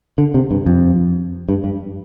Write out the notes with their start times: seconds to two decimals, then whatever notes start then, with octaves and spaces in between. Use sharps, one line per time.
0.18 D3
0.34 C3
0.51 G2
0.66 F2
1.49 G2
1.64 G2